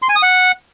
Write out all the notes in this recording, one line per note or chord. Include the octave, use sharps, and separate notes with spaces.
C6
G#5
D#6
F#5